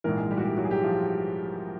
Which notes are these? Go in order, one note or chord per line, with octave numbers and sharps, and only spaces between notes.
A#1 G#2 E3 A#3 A#4
G#3 G#4
G3 G4
F#4
G3 G4
F#3 F#4
G#4
G3 G4
F3 F4